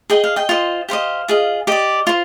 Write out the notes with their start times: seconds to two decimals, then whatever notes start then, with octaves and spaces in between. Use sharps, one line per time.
0.10 G#4 D#5 G5
0.24 F5
0.36 D#5 G5
0.49 F4 C5 D#5
0.89 G4 C5 D#5 F5
1.28 F4 G#4 D#5
1.67 G4 D5 D#5
2.07 F4 C5